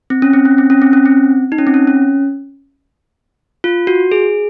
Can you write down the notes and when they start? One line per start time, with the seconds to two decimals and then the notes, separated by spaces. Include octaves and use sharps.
0.10 C4
0.22 C#4
0.33 C4
0.45 C#4
0.58 C4
0.70 C#4
0.82 C4
0.93 C#4
1.06 C4
1.52 D#4
1.58 C#4
1.67 C4
1.74 C#4
1.87 C#4
3.64 F4
3.87 F#4
4.12 G#4